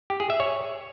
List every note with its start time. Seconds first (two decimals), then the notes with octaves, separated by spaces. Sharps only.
0.10 G4
0.20 G#4
0.30 E5
0.40 C#5